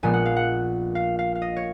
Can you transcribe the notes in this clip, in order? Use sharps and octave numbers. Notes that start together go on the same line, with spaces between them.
A#1 A#2 G#3 B3 G#5
F#5
F5
F#5
F5
F5
F5
D#5
C#5